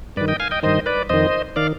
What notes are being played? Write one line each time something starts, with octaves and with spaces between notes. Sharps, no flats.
G2 D#3 B4 D5
D#5 G5
F5 G#5
D#5 G5
G2 D#3 C5 D#5
B4 D5
F2 D#3 C5 D#5
D#3 D5 F5